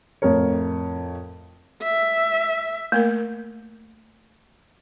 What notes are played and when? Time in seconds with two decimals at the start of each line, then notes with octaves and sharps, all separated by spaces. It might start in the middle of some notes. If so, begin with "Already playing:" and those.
0.22 F2 A2 A#4 C#5
1.82 E5
2.92 A3 A#3 A#4